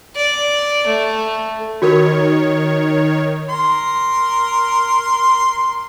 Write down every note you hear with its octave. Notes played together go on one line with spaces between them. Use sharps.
D5
A3
D#3 F#4 A#4 C#5
A#4 C6